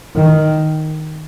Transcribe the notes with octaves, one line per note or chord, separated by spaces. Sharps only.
D#3